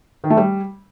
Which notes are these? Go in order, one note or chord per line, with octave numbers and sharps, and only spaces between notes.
D#3
A3
G3